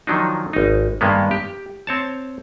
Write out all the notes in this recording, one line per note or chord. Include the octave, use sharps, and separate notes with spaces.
D#3 F3 F#3 D4 D#4
G#1 D#4
G2 D#3 G#3 A#3 B3
G4
C4 C#5 A5